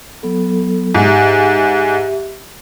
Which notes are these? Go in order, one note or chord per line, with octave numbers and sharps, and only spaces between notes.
F#3 B3 A4
G#2 G4 E5